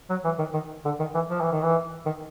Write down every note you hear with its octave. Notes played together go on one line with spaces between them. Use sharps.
F#3
E3
D#3
D#3
D3
D#3
E3
F3
E3
D#3
E3
D#3